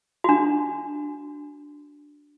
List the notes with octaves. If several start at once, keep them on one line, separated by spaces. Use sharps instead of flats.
D4 F#4